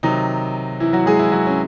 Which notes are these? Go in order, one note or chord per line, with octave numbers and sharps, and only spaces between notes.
C3 D#3 F#3 D#4
E3 E4
F#3 F#4
G#3 G#4
E3 E4
F#3 F#4
C#4